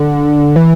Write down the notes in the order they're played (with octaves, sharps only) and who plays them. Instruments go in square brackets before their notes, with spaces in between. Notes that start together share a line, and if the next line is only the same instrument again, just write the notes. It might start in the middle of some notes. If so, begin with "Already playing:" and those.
Already playing: [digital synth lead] D3
E3